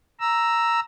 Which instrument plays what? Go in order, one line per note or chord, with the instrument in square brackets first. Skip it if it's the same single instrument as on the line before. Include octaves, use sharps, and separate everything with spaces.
[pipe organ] A#5 E6